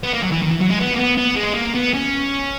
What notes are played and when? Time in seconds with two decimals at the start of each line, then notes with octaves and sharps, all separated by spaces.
0.03 B3
0.13 A#3
0.22 F#3
0.32 E3
0.42 D#3
0.51 E3
0.61 F#3
0.70 G#3
0.79 B3
0.93 A#3
0.98 B3
1.17 B3
1.36 G#3
1.54 A#3
1.74 B3
1.93 C#4